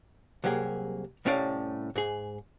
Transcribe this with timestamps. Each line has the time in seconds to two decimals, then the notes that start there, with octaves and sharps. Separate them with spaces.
0.44 C2 F#3 A#3 G4 G#4
1.25 C2 A2 C#4 G4 D5 F5
1.96 G#2 G#4